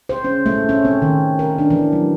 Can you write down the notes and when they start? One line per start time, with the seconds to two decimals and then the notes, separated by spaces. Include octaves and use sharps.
0.09 C5
0.24 C#4
0.46 A3
0.69 C#4
0.85 C4
1.02 D#3
1.39 A#4
1.58 D4
1.70 E3
1.92 F#3